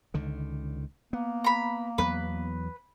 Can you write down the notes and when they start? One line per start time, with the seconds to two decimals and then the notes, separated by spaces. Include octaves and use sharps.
0.14 C#2 D3 D#3
1.13 A#3 B3
1.44 A#5 B5
1.98 E2 F#3 B3 B4